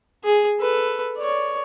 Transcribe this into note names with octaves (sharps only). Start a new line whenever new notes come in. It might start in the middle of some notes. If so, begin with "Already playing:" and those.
G#4
A4 B4
C#5 D5